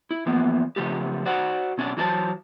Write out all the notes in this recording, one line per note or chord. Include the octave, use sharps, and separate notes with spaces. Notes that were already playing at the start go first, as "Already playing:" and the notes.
E4
E3 F3 A#3 B3
C#3 F3 A3 G4
F#4 C5 D5 F#5
B2 C#4 D4 D5
E3 F#3 D4 C5 A5